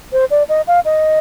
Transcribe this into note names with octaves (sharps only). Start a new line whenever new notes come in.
C5
D5
D#5
F5
D#5